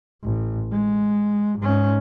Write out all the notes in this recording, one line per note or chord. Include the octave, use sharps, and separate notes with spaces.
A1
G#3
G#2 C#4